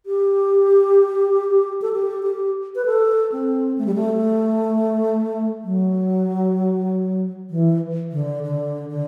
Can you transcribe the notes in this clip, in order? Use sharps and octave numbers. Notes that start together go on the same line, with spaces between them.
G4
A4
G4
G4
B4
A4
C4
A3
G3
A3
F#3
E3
D3
D3
D3